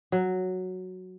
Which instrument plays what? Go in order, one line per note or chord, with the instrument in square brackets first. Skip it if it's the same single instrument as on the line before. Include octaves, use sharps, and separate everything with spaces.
[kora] F#3